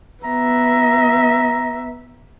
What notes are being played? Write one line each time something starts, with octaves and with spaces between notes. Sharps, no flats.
B3 E5 A#5